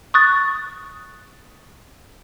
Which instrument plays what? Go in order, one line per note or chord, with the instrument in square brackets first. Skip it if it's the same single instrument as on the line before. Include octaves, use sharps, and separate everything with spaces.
[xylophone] C#6 D#6 F#6 A6